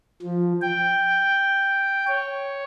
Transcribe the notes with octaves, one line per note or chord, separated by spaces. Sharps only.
F3
G5
C#5